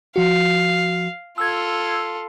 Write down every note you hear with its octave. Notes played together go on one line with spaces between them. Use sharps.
F3 F#4 F5
F4 A4 E6 G#6